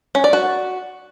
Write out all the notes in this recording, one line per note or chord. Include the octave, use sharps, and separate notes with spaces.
C#4
D5
F#4